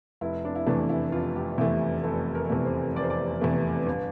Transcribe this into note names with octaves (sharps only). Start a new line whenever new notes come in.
F1 E4
D4
E4
E2 C3 E3 A3 D4
E4
F1 F4
G4
E2 C3 E3 A3 E4
F1 A4
A#4
E2 C3 E3 A3
C5
F1 D5
C5
D5
E2 C3 E3 A3
G1